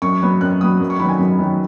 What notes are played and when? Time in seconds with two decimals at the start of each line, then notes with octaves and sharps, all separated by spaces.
0.02 F#2 C#6
0.22 F#3 B3
0.41 F#2 F#6
0.61 F#3 B3 D#6
0.80 F#2
0.90 C#6
1.00 D#3 F#3 B3 B5
1.09 G#5
1.19 F#2
1.39 D#3 F#3 B3